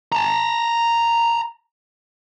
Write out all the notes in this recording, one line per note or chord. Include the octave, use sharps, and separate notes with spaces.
A5 A#5